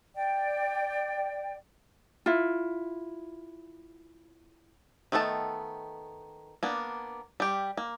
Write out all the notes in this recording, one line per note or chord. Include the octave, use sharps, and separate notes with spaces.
D5 G5
E4 F4
D#3 A3 B3 A4 A5
A#3 B3 D4
G3 G4
A#3